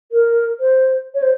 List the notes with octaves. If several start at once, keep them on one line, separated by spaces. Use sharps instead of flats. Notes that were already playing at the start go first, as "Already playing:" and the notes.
A#4
C5
C#5
C5